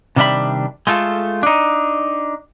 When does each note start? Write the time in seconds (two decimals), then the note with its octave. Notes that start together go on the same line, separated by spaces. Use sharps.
0.16 C3 D#3 G3 D4 E5 B5
0.87 G#3 A3 F4 A4
1.43 D4 D#4